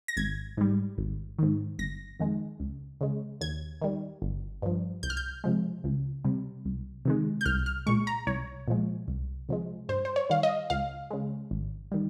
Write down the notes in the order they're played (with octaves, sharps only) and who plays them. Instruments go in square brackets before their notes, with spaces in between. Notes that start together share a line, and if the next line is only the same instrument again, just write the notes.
[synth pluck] A#6
G#1 G#6
G#2 G3
G#1
G#2 D#3
G1 A#6
F2 D#3 G#3
C#2
C#3 G#3
D#2 G#6
D#3 G3
G1
G2 F3
C2 G6
F6
G6
C3 F3 G#3
C#2
C3 G3
C2
C3 D#3 G#3
G6
C2 F6
F6
A#2 G#3 C#6
A#5
C2 C#5
A#2 F3 G#3
C2
C3 F3 G#3
G2 C5
C5
C#5
D#3 G3 F5
D#5
C#2 F5
C#3 G#3
G#1
D#3 G3